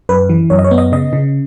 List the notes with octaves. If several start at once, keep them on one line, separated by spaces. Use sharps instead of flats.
F#2 B4
E3
F#2 C#5
D#5
C#5
B3
D#5
C#3 D#5
C#3